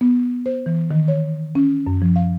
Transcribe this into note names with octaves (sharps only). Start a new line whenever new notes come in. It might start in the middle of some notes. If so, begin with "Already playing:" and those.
B3
C5
E3
D#3
C#5
C#4
F#2
F3
F5